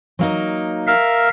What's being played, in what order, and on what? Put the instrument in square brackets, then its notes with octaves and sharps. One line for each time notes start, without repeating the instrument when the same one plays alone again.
[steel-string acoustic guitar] F#3 A#3 D#4
[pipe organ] A#4 E5 F5